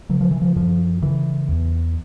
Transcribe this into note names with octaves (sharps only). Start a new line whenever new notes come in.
C#3 F#3
F3
E3
F3
F#2 F3
C#3 E3
E2